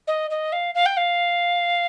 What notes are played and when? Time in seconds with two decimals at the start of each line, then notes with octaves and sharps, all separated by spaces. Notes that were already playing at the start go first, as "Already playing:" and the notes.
0.07 D#5
0.30 D#5
0.52 F5
0.74 F5
0.86 G5
0.97 F5